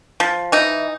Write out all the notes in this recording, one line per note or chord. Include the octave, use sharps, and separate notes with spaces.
F3
E3 D#4